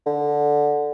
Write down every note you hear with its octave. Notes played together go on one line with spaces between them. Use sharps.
D3